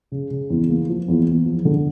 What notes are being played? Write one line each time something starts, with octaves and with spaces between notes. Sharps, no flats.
C#3
C#3
E2
A#3
F3
E2
E2
F3
D3